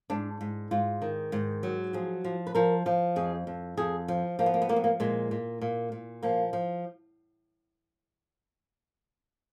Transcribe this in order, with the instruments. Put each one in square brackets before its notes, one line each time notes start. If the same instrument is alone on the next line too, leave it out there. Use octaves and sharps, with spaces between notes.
[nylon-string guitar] G#2 D4
G#2
G#2 F4
D#3
G#2
F#3
F3 G#4
F3
B4
F3 A#4
F3
F2 G#4
F2
F2 G#4
F3
F3 A#3
B3
A#3
B3
F3 A#3
B3
A#3
A#2 G#3
A#2
A#2
A#2
F3 A#3
F3